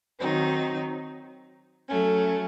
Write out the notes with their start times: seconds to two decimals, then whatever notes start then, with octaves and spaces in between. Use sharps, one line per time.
0.19 D#3 F#3 C4 D#4
1.88 F#3 A3 C#4